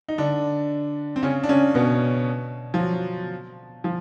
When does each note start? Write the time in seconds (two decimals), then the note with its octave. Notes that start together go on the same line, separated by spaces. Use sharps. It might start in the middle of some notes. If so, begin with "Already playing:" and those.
0.08 D#4
0.18 D3 D4
1.16 C4
1.23 C#3 C#4
1.43 D4
1.49 C#3 C#4
1.75 B2 B3
2.74 F3
2.79 F#3
3.84 F3